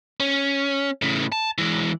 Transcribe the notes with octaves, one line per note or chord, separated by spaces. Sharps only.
C#4
A2 C#3
A5
E3 G#3